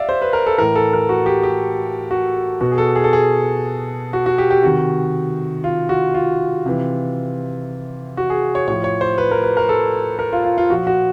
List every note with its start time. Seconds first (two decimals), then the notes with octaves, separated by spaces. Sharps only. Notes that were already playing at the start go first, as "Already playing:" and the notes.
Already playing: D5 E5 F5
0.09 C5
0.22 B4
0.33 A#4
0.46 A4
0.58 A2 E3 A#4
0.76 A4
0.93 A#4
1.09 F#4
1.26 G4
1.43 G4
2.11 F#4
2.61 B2 F#4
2.71 G#4
2.78 A4
2.95 G#4
3.04 A4
3.13 G#4
4.13 F#4
4.26 F#4
4.38 G4
4.51 G4
4.63 C3 D#3 F#4
5.64 F4
5.89 F#4
6.14 F4
6.66 C3 E3
8.17 F#4
8.30 G#4
8.55 C#5
8.68 A2 F3 C#5
8.84 C#5
9.01 C5
9.18 B4
9.31 A#4
9.44 B4
9.57 A#4
9.69 A4
10.19 A#4
10.33 F4
10.44 F4
10.58 F4
10.70 A#2 F3 F#4
10.87 F#4